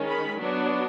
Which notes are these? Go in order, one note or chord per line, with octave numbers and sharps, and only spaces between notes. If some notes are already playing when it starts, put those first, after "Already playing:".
Already playing: D#3 G#3 C#4
B5
F#3 B3 D4